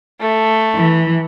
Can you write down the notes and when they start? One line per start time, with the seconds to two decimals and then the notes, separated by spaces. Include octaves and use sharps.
0.20 A3
0.75 E3